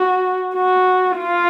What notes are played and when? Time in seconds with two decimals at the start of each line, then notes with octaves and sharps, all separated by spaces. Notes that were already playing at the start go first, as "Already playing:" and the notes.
Already playing: F#4
0.55 F#4
1.18 F4